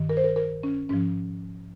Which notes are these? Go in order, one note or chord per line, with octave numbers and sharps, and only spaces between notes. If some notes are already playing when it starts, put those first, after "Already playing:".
Already playing: G2 D#3
A#4
C5
A#4
A#4
C#4
G#2 F3 C#4